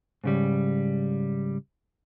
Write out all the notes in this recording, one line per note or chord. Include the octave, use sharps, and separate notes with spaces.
G#2 C#3 G3